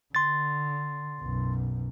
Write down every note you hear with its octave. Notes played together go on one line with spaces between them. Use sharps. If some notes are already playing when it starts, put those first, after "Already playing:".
D3 C6 A6
B1 F#2